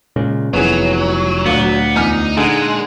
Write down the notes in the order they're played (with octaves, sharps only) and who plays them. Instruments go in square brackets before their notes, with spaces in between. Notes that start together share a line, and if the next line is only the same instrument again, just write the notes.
[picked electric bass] A#2 C#3 G#3
[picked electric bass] F1 E3 [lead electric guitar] F#3 [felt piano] B3 G#4
[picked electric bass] D2 [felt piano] A#2 [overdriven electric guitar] B3
[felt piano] E2 G#5 F6 [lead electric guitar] D#4
[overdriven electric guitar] A#2 [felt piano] D3 D#4 G#4 [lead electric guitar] G#3